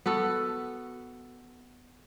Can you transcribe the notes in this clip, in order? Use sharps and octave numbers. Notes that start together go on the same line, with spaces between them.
B3 F#4 A4